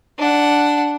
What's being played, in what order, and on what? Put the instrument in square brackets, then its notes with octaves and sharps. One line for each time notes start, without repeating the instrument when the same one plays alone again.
[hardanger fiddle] D4 F#5